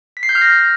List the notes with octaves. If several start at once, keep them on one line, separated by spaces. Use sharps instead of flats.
B6
C7
G6
F6
A#6